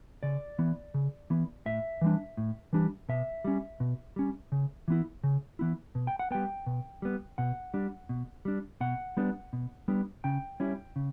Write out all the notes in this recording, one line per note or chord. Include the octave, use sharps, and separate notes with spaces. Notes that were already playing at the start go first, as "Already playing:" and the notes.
C#3 D5
E3 B3
C#3
E3 B3
A2 E5
E3 G3 D4
A2
E3 G3 D4
B2 E5
G3 C#4
B2
G3 C#4
C#3
E3 B3 E4
C#3
E3 B3 E4
B2
G5
F#5
G3 B3 G5
B2
G3 B3
B2 F#5
G3 D4
B2
G3 D4
B2 F#5
G3 B3 D4
B2
G3 B3 D4
C#3 G5
G3 C#4 E4
C#3